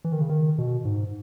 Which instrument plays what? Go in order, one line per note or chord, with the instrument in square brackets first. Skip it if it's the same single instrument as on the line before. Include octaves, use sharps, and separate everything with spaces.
[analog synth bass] E3
D#3
C#3
D#3
B2
G#2